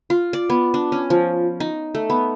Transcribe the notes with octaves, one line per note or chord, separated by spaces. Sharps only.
F4
D5
B3
D4
C#4
F3
D#4
A3
B3